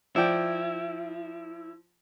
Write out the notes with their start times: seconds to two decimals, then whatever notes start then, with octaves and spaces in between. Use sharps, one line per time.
0.16 F3 E4 D5 G5